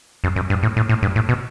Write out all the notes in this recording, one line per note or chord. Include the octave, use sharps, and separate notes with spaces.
F#2
F#2
G2
A2
A2
A2
G2
A2
B2